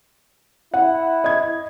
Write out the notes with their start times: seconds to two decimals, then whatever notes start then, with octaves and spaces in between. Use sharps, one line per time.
0.74 E4 F#5
1.24 D#5 G#6